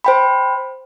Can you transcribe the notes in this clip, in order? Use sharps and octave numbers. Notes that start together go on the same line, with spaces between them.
C5 G5 B5